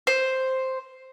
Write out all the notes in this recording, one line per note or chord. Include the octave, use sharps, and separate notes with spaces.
C5